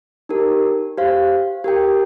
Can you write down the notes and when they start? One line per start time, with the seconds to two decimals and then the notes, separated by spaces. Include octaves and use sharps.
0.29 D#4 G4 A#4
0.98 G4 C5 F5
1.64 G4 A#4 G5